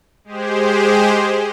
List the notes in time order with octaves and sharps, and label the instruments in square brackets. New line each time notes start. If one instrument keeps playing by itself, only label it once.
[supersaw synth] G#3 G4 G#4 C5